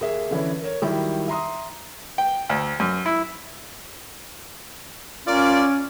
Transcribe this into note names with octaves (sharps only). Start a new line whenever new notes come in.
D#2 A#3 G#4 E5
D3 E3 C#4 E4
A#4 C#5
D#3 F#3 G3 E4 G4
E5 A#5 C6 D#6
G5
D2
F#2
E4
C#4 F4 A#4 D5